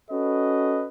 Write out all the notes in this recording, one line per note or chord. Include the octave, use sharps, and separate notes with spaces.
C#4 F#4 A4 B4 D#5